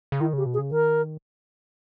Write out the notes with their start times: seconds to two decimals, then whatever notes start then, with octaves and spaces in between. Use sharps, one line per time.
0.12 C#3
0.21 D#3 E4
0.33 C#3 G4
0.46 B2
0.54 G#4
0.59 C#3
0.71 D#3 A#4